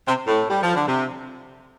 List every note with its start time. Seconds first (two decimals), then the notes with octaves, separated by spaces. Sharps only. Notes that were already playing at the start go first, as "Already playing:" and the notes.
0.08 C3
0.27 A2
0.49 G3
0.62 F3
0.75 D3
0.88 C3